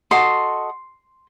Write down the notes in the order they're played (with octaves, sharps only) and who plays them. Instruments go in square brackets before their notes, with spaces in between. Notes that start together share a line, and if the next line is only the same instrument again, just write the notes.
[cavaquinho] F#4 A4 D#5 C6